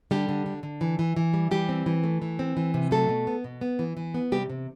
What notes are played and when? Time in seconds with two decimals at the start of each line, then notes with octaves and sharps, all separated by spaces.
0.11 D3 G3 G4
0.29 D3
0.46 D3
0.63 D3
0.81 E3
0.99 E3
1.16 E3
1.33 G3
1.51 E3 G3 G4
1.69 C4
1.86 E3
2.04 A3
2.22 E3
2.39 C4
2.57 E3
2.74 C3
2.91 F#3 A3 A4
3.09 B2
3.27 B3
3.44 B2
3.61 B3
3.79 E3
3.97 E3
4.14 B3
4.32 C3 G3 G4
4.50 C3